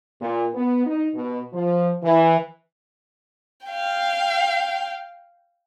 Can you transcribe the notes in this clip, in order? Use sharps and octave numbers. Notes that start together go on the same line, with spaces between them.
A#2
B3
D#4
B2
F3
E3
F5 G5